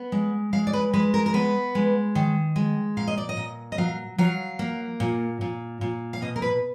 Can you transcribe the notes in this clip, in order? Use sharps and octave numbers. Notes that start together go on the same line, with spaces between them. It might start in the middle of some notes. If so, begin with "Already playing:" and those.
Already playing: B3
G#3
G#3 F5
D5
B4
G#3 B4
A#4
A#4
B3 B4
G#3
D#3
G#3
A#2 F5
D#5
D5
D#5
A#2
D#5
F#3 F5
F#3 F5
A#3
A#2
A#2
A#2
F5
B2 D#5
A#4
B4